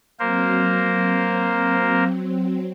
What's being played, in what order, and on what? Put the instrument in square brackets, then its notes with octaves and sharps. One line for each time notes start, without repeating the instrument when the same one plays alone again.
[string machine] F#3 C4 [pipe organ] A#3 A#4 C5